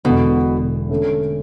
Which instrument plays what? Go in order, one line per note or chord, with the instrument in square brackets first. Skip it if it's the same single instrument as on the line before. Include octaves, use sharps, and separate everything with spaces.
[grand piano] E1 E2 D3 [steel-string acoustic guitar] B2
[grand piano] D3 A3 C#4